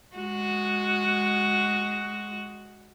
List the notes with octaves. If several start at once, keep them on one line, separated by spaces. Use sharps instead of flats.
G#3 F#4